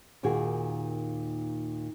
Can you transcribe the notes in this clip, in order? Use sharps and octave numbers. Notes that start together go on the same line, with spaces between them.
D#2 A#2 D#3 F#4 G#4